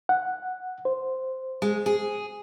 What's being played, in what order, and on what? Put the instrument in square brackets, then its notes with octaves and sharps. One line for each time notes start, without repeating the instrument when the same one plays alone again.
[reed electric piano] F#5
C5
[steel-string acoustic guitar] G#3
G#4